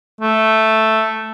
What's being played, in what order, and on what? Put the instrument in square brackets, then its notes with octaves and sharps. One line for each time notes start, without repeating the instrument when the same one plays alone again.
[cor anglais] A3